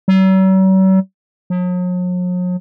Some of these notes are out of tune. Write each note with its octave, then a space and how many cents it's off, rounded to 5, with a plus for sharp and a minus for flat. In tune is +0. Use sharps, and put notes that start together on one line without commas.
F#3 +45
F#3 -45